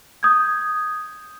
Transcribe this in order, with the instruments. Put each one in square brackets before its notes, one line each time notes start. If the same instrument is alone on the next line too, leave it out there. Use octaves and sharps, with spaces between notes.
[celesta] D#6 G6 G#6